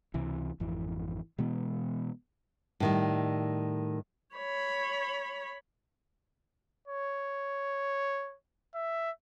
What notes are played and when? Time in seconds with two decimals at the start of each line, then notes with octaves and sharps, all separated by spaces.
0.14 C#2 C3 E3
0.60 G#1 F2 E3
1.38 B2 E3 G#3 B3
2.80 A2 D#3 G3
4.35 C#5 B5
6.87 C#5
8.74 E5